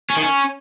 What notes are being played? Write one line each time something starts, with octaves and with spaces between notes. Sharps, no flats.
C#4
D#3
C#4